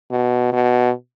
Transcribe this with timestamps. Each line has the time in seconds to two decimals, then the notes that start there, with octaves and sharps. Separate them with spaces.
0.11 B2
0.52 B2